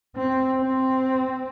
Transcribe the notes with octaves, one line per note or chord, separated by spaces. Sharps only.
C4
C4